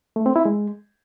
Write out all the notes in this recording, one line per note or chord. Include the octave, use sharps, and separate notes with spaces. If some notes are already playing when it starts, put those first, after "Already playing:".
A3
C4
E4
G#3